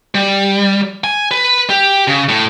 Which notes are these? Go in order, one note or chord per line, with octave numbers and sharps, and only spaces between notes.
G3
G#5
B4
G4
C#3
A2